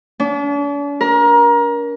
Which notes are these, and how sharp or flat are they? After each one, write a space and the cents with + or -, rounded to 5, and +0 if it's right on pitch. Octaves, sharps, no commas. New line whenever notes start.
D4 -45
A#4 +25